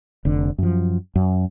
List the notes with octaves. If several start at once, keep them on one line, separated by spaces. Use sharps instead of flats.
F1 D3
F#2 F3
F#2